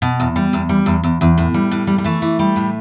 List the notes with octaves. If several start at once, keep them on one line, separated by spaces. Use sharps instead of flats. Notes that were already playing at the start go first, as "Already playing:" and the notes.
B2
E2
G3
E2
G3
E2
E2
E2
A2
G3
A2
G3
G3
E3 A3
E3
G3
A2